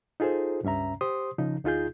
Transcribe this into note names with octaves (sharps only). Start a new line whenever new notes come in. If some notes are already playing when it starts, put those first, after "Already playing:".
D#4 F4 G#4 A4 C5
C#2 G2 C#4 E5 A#5
G4 C5 C6 D#6
C#3 F3 D#4
D2 D#4 F4 G#4 G6